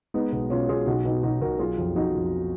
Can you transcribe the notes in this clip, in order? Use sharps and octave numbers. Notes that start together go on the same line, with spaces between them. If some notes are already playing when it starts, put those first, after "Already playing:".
G#3 B3 D#4
B1 B3
B2 C#4 F4
B2 F4 G#4
B1 D#4 F#4
B2 B3 D#4
B1 D#4 F#4
B1 F#4 A#4
F#3 F4 G#4
F2
F2 D#4 F#4
F2